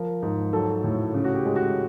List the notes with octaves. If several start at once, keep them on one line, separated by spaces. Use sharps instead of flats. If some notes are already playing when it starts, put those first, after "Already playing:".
Already playing: F3 A#4
G#2
F#3 A4
A2
C#3
F#4
G4
G#3
F#4